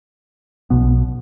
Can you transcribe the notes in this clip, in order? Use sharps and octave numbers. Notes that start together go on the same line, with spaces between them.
B1 B2 B3